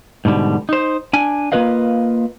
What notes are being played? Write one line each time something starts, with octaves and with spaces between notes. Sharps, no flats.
G#2 B2 D3 G3
D#4 C5
D4 G#5
A#3 B3 F4 B4 D#5 F5